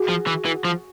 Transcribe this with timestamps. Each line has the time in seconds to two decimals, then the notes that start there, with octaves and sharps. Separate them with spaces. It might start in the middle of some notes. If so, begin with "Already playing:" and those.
Already playing: F#4 G#4
0.09 F3
0.27 E3
0.46 E3
0.65 F3